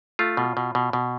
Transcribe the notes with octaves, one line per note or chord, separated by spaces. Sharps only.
A3 F4
B2
B2
B2
B2